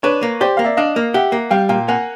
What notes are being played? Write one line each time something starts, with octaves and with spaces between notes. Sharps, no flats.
D4 B4 C#5
A#3
G4 C5 D5
A#3 F5
D5 E5
D4 D#5 F5
A#3
G4 E5 F#5
A#3
G3 F5 G5
A#2 F5 G5
A#3 F#5 G#5